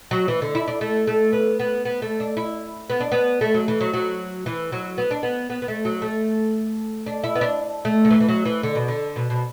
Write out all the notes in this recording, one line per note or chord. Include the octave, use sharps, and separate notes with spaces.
F#3
E3
D3
E4
D4
A3
A3
B3
B3
B3
A3
D4
E4
B3
D4
B3
A3
F#3
E3
F#3
F#3
E3
F#3
B3
D4
B3
B3
B3
A3
F#3
A3
D4
E4
B3
D4
A3
D3
E3
E3
F#3
E3
D3
B2
D3
B2
B2